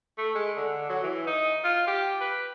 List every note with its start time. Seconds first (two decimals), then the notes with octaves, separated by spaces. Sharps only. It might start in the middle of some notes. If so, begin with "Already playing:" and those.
0.18 A3
0.35 G#3
0.57 D3
0.90 F#3
1.03 E3
1.27 D#4
1.64 F4
1.87 G4
2.21 B4